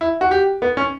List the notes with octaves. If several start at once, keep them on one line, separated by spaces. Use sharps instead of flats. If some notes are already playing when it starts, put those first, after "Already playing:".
E4
F#4
G4
B3
C#4